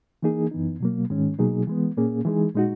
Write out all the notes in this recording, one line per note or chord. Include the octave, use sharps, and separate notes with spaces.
E3 A#3 D#4 G#4
F#2 E3 B3 D#4
B2 F#3 A#3
G#2 D#3 G#3 C#4
B2 F#3 A#3 D#4 G#4
E3 G#3 B3
A#2 A#3 C#4 G#4
E3 G#3 D#4 G#4
A#2 G#3 D#4 F#4